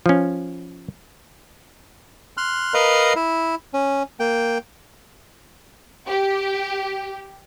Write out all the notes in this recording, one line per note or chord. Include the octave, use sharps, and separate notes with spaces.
F3 C#4
C6 F6 F#6
A#4 B4 D#5 F5 A#5
E4
C#4
A#3 G5
G4